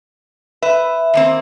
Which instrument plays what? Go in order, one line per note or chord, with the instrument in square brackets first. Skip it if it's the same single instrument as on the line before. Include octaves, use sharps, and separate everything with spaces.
[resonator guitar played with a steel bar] B4 [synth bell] E5
[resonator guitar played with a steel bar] D#3 A#3 C4